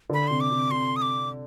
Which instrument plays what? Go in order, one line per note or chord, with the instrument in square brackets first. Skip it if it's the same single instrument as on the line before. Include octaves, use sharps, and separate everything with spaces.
[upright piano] D3 [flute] B5
[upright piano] C3 [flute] C6
[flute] D6
[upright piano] C3
[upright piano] C3 [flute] C6
[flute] D#6
D6